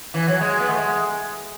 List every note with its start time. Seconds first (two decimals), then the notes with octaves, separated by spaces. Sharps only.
0.14 E3
0.28 F#3
0.41 G#3
0.60 B3
0.69 A3
0.77 G#3